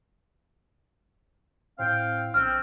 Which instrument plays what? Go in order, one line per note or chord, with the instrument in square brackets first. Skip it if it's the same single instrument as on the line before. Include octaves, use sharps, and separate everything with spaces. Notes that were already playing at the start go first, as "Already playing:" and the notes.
[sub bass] A2 [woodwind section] C4 F5 G5
[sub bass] A#1 [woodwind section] C4 [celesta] F6